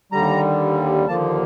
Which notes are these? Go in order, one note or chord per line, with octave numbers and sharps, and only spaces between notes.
D#2 D3 G3 A#5
D#2 D3 F3 A#3 A5